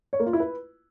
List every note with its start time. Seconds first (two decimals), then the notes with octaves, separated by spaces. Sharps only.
0.13 C#5
0.20 A#3
0.26 F4
0.33 E4
0.40 B4